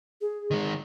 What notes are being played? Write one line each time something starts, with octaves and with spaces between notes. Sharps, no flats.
G#4
D#3 G#3